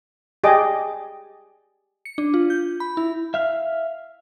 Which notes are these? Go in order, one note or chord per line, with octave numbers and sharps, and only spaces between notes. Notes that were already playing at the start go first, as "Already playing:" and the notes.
G4 G#4 D5 D#5 D6
C#7
D4
F4
G6
B5
E4
E5 F5